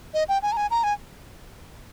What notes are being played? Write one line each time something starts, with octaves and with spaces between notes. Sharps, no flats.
D#5
G5
G#5
A#5
G#5
A#5
G#5